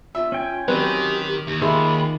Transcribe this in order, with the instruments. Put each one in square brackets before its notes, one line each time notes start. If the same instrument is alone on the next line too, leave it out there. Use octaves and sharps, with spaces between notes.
[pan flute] F4 [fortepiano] E5
[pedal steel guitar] C#4 G5 G#5
[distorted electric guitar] D#3 [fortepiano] F#3 C4 B4 [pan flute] G4
[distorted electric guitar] D#2
[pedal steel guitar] D#3 F4 [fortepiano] G#3 E5 C6 [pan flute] B5